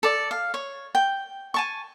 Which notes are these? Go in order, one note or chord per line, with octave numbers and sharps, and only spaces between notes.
A4 D5
F5
C#5
G5
G#5 A5 C#6